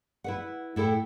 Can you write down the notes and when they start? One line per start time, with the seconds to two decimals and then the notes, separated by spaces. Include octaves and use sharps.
0.24 E4 B4 F#5
0.76 A2 E4 A4 G5